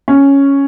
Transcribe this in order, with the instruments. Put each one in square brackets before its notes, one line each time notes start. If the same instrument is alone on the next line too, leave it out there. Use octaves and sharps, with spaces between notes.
[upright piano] C#4